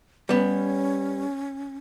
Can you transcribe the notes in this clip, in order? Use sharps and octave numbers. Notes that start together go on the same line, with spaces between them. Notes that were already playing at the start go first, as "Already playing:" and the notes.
G3 B3 C#4